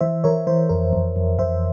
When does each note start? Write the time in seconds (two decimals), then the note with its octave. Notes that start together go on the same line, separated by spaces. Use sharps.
0.01 E3 C5 E5
0.24 E3 A#4 C#5
0.47 E3 C5
0.69 F2 A#4
0.93 F2
1.16 F2
1.38 F2 C5 E5